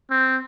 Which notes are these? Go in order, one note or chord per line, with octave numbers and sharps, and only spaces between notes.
C4